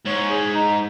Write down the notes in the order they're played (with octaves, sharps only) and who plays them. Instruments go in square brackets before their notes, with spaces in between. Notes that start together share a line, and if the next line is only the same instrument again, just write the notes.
[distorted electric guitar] G#2 [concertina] C#5
[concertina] G#4
D#4